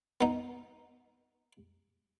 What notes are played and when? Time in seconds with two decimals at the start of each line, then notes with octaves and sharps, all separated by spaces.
0.21 B3 D#4